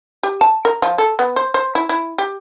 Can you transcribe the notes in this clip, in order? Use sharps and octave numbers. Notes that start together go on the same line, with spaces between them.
G4
A5
A#4
F3
A4
B3
C5
C5
E4
E4
G4